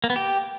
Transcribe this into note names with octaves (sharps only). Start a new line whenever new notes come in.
A#3
B3
G4